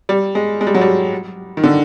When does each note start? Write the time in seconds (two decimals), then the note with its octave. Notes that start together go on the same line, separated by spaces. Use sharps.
0.09 G3
0.35 G#3
0.61 G#3
0.67 G3
0.75 F#3
0.81 G3
1.57 D#3
1.64 D3